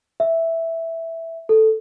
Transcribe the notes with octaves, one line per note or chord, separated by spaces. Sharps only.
E5
A4